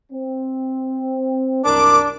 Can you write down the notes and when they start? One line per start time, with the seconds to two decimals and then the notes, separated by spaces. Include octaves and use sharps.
0.12 C4
1.65 C2 F#2 D4 A#4 D6